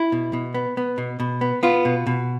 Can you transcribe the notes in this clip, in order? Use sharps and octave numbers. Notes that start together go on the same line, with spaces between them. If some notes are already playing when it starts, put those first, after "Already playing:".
Already playing: E4
B2
B2
B3
B3
B2
B2
B3
B3 F4
B2
B2